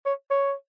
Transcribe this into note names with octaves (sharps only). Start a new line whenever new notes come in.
C#5
C#5